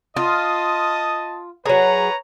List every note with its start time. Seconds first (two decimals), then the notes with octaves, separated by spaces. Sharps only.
0.16 F4 D#5 A5 D#6
1.66 F#3 G#4 B4 C#5 A#5